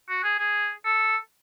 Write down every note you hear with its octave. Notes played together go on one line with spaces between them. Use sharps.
F#4
G#4
G#4
A4